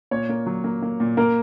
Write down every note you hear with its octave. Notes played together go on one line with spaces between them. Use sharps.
A#2 C#5
A#3
F#3
A#3
A#3
A#2
A#3 A#4